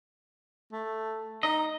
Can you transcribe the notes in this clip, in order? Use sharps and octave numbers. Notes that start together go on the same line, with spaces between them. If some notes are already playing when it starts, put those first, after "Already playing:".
A3
D#4 D#5